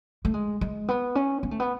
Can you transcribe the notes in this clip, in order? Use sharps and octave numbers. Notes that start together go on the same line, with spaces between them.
A3
G#3
G#3
B3
C#4
B3
A3
B3